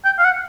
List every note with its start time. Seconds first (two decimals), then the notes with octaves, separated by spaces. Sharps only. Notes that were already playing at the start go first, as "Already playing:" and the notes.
0.05 G5
0.18 F5
0.24 F#5